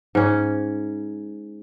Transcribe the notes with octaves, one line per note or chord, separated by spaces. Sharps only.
G#2 C#4